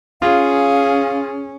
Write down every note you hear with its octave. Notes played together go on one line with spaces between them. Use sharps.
C#4 F4 G#4 F5